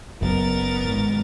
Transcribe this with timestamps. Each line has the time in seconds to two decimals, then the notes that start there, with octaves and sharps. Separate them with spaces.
0.21 F#1 F#2 B3 A#4 A6
0.82 G#1